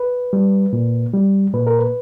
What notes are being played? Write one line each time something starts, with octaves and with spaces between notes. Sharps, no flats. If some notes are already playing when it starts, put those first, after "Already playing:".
Already playing: B4
G3
A#2
G3
A#2 B4
A#4
B4